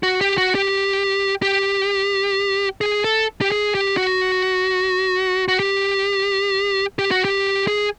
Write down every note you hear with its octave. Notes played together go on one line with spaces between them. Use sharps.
F#4
G4
F#4
G4
G4
G#4
A4
G4
G#4
G4
F#4
F#4
G4
G4
F#4
G4
G#4